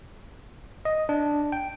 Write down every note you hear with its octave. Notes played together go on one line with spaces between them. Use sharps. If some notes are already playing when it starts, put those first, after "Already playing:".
D#5
D4
G5